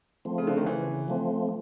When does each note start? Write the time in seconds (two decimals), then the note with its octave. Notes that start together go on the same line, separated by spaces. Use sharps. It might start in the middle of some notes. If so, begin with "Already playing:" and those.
0.25 F3 A3 C4
0.38 C#3
0.47 D3
0.57 D#3
0.66 C#3 E3
1.08 F3 A3 C4